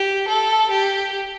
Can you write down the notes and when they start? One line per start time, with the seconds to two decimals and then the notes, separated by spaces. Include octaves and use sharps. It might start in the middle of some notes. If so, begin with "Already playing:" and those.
Already playing: G4
0.28 A4
0.71 G4